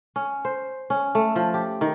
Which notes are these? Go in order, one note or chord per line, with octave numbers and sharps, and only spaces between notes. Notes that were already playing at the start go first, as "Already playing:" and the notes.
C#4
C5
C#4
A3
F3
G4
D#3